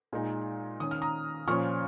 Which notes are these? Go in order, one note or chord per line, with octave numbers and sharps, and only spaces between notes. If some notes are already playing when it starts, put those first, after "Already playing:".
A#2 G#3 D#4
D#3 C#4 D#6
F6
A#5 D#6
A#2 F3 C#4 C#6 F6